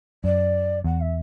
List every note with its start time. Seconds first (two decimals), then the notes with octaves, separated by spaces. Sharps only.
0.24 F#2 D5
0.84 E2 F#5
1.01 E5